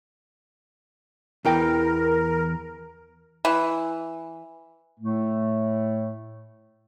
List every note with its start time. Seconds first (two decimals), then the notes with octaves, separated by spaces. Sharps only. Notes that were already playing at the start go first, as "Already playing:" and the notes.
1.45 E2 E3 A#4 G5
3.45 E3
5.00 A2 A3